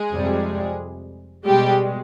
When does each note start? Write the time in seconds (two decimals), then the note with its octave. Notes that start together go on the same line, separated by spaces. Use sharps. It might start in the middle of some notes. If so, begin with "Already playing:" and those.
Already playing: G#3 G#4
0.12 F2 C3 G3
1.46 B2 G3 G#3 G4